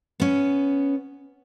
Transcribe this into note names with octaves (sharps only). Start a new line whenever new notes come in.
B3 C#4